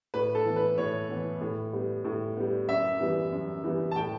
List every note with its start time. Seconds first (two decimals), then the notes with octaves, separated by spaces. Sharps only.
0.14 A2 B4
0.35 A4
0.46 E3 B3
0.56 B4
0.78 A2 C#5
1.09 E3 B3
1.41 A2
1.73 G3 B3
2.05 A2
2.37 G3 B3
2.69 F#2 E5
3.00 E3 G3 B3
3.32 F#2
3.64 E3 G3 B3
3.91 A5
3.96 A2 G5